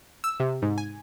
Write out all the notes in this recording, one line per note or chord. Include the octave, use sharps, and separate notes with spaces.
E6
C3
G#2
G#5